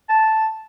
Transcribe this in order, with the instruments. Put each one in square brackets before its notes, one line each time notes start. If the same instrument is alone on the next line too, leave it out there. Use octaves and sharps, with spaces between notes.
[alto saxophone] A5